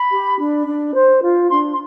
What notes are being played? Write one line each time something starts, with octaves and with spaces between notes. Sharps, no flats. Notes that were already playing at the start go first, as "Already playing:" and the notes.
Already playing: B5
G4
D4
D4
C5
F4
D4 C6
C6